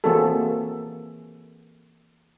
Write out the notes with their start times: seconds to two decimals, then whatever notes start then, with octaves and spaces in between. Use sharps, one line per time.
0.04 E3 A#3 C4 F#4 G#4 A4